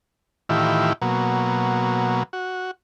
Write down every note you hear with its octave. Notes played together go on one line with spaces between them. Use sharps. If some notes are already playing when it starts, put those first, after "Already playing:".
A2 D#3 E3 E4 F4 G4
B2 F#3 A#3
F#4